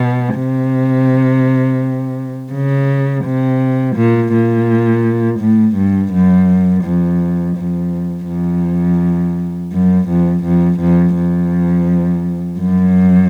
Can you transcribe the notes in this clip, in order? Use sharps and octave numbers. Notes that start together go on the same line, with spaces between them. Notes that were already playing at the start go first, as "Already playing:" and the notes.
Already playing: B2
C3
C#3
C3
A#2
A#2
A2
G2
F#2
F2
F2
F2
F#2
F2
F2
F2
F2
F#2